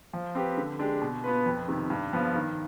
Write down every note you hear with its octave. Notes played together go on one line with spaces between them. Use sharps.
F3
C4 G4 B4
D3
G#3 D4 G4
B2
B3 F4 B4
F2
C3 D#3
G2
F3 B3
D#3